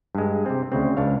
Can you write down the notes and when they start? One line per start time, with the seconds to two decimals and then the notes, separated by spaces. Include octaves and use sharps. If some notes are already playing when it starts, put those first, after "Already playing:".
0.15 G2 G#3
0.46 C3 C4
0.72 D2 C#3 C4
0.97 C#2 D4 C#5 F5